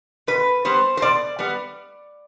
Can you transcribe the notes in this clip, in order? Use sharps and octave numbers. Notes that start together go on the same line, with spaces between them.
B2 B4
G3 B3 C5
C5
B2 D5
G3 B3